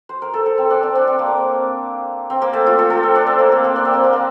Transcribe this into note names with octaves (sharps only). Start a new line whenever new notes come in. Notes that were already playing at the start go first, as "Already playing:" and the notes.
C5
A#4
A4
A4
C4
D4
C4
D4
C4
A#3
C4
A#3
A3
F4
A4
A4
C4
D4
C4
A#3
A#3
C4
D4
C4
A#3
A#3
D4